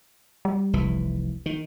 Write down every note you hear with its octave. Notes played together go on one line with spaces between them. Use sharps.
G3
F1 C2 E3
D#3